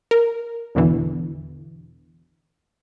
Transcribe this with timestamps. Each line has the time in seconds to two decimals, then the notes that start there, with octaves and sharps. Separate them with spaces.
0.11 A#4
0.75 G#1 E2 B2 D3 E3